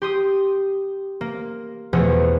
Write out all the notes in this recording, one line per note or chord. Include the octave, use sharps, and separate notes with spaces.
G4 C6 D#6
A#3
E2 B2 F3 A3